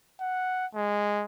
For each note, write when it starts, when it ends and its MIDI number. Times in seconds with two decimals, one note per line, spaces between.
0.20 0.66 78
0.75 1.25 56